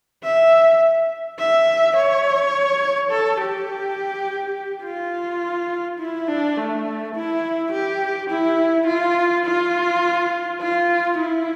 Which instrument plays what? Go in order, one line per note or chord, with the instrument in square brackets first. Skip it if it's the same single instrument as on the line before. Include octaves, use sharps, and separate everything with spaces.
[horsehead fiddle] E5
E5
C#5
A4
G4
F4
E4
D4
A3
E4
G4
E4
F4
F4
F4
E4